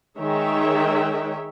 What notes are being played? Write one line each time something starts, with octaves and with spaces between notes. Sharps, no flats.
D#3 G#3 G#4 C#5 E5 G5